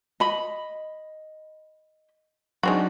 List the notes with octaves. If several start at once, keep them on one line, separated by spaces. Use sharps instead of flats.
D#5 B5
F#3 G#3 C4 D4 D#4 F#4